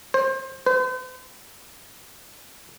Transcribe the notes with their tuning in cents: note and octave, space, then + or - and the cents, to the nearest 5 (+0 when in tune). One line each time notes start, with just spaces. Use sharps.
C5 +25
C5 -45